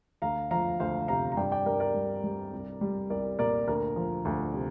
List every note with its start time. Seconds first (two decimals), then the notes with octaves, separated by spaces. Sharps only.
0.22 D2 F5 A#5
0.51 F3 F5 A#5
0.80 D2 C5 F5
1.08 C3 F5 A#5
1.32 A#5
1.37 G2 D5 G5
1.52 D5 G5
1.66 G2 A#4 D5
1.80 A#4 D5
1.94 G3
2.24 G3
2.53 C2
2.81 G3
3.10 C2 A#4 D5
3.39 A#2 A#4 D5
3.67 D2 A#4
3.96 F3
4.25 D2
4.54 C3